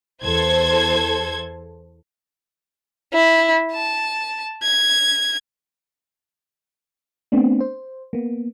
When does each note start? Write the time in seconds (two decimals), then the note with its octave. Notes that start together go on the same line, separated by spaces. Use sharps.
0.23 E2 A4 C5 G#6
3.13 E4
3.72 A5
4.63 G#6
7.32 A3 B3 C4 D4
7.60 C5
8.13 A#3 B3